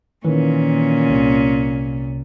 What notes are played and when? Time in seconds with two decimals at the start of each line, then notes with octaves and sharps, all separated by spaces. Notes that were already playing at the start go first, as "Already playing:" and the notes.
0.25 A#2 D#3 E3 C#4
1.09 C2 C3